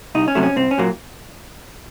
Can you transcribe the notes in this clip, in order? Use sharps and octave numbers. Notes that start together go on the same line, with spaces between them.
C2 D#4
C#4
C3 F#3 A3
C#4
C2 C4
C#4
A#2 F#3 A#3